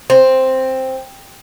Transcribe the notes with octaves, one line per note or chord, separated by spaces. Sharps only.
C4